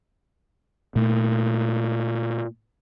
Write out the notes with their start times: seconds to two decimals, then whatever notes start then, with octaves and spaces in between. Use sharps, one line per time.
0.96 A#2 A3